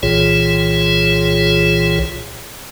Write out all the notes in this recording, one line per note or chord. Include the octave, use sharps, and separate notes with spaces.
C2 A#2 E3 F4 G#4 C#5